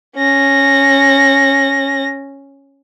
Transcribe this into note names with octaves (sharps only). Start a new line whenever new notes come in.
C#4 A#6